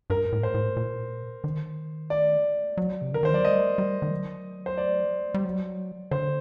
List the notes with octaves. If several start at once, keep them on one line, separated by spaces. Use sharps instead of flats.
G2 A#4
A2
C5
A2
A#2
D#3
D5
F#3
C3
D3 A#4
D#3 C5
F#3 D5
G3 D#5
G3
D#3
F#3
C5
D5
G3
F#3
D3 C5